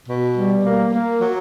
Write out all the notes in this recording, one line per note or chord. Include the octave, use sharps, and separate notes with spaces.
B2
G3
A#3
A#3
F#3